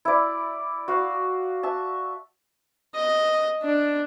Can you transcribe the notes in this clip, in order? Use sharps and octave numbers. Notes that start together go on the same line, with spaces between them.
E4 D5
F#4 F5
E5 A5
D#5
D4